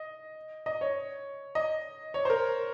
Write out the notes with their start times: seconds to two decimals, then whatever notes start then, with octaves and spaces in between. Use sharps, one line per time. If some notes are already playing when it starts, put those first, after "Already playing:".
Already playing: D#5
0.66 D#5
0.81 C#5
1.55 D#5
2.14 C#5
2.25 C5
2.30 A#4